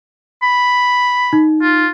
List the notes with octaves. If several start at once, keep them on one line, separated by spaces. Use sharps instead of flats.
B5
D#4
F4